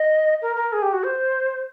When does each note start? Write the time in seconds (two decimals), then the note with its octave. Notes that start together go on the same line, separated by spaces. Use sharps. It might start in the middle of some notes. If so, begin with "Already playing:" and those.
Already playing: D#5
0.42 A#4
0.56 A#4
0.73 G#4
0.82 G4
0.93 F#4
1.04 C5